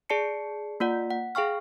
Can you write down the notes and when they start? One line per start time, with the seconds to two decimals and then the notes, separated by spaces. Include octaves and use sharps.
0.10 G#4 D5 A5 C7 C#7
0.80 A#3 F4 D5 F#5
1.11 F#5
1.35 G#4 F5 G5 C#6 F6